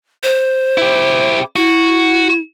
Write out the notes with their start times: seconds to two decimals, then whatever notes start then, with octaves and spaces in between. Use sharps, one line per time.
0.23 C5
0.78 E4 G4
1.56 E4 F#4